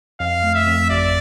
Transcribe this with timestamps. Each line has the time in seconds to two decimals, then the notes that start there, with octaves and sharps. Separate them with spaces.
0.20 F2 F5
0.43 A3
0.55 E5
0.67 F2
0.90 G#1 D5